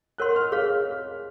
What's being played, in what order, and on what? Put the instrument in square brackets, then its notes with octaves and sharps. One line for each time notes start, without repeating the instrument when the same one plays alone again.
[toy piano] A#4 C#5 F#5 C6 [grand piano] F#6
[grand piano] F6
[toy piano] G#4 C#5 F5